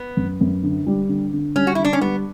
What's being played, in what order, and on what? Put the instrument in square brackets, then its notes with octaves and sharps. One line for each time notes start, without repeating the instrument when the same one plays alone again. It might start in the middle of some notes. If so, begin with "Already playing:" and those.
Already playing: [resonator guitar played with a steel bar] B3
[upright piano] F#2
F#2
D3
G3
D3
D3
[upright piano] G3 [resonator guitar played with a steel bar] C#4
[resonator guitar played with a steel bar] F#4
[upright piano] D3 [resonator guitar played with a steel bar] E4
[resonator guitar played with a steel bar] D4
C#4
[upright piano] G3 [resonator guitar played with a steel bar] B3